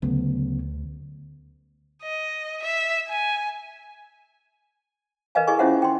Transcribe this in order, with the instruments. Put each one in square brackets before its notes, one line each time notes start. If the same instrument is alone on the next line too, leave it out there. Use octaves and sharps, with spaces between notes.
[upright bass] D2 [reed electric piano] C#3 F#3 B3
[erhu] D#5
E5
G#5
[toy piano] A#4 B4 D#5 F5 G#5
E4 G#4 A4 D#5 G#5 C#6
C#4 E4 F4 C5 E5 F#5
G5 C6